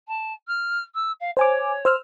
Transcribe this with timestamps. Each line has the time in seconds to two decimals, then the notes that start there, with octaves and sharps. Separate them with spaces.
0.08 A5
0.48 F6
0.94 E6
1.20 F5
1.37 C5 C#5 G#5 D6
1.85 C5 E6 F6